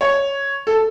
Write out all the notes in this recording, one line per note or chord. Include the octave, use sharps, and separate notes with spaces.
C#5
A4